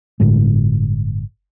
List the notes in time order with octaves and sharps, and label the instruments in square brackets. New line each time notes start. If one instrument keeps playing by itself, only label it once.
[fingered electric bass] G1 A2 D3 G#3